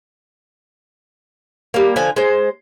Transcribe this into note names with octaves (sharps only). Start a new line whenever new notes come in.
G3 A#3
D3 F3 G#5
G#3 C5